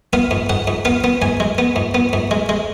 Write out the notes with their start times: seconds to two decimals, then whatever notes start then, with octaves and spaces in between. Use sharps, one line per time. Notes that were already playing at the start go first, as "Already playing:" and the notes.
0.13 B3 F5
0.31 G#2
0.49 G#2 F#5
0.67 G#2
0.85 B3 F5
1.04 B3
1.22 G#2 G#5
1.40 G#3
1.58 B3
1.76 G#2
1.94 B3
2.13 G#2
2.31 G#3
2.49 G#3